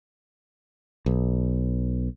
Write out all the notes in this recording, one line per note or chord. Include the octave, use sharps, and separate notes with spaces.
B1